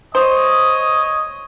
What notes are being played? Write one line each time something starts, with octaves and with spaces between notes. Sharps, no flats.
C5 C#5 D#5 D#6